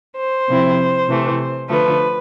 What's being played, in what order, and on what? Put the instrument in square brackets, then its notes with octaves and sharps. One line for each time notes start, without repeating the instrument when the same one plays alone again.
[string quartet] C5
C3 F3 C4 E4
C3 E3 A3
D3 F3 A3 B4